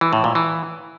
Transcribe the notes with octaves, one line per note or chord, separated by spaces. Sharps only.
E3
A2
A#2
E3